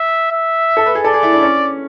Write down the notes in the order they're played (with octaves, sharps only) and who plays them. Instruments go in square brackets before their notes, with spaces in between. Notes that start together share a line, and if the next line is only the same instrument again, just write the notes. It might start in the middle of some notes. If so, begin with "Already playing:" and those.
Already playing: [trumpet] E5
E5
[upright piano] A4
B4
G#4
[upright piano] A4 [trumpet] D5
[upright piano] G#4
E4
D4
C#4